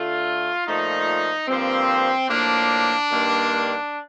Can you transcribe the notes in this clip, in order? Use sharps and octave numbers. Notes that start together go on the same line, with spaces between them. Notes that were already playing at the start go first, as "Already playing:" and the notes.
Already playing: D3 A3 F4
A#2 F3 A3 D#4
G2 F3 A#3 C4
A2 F3 A#3 D4
G2 D#3 A#3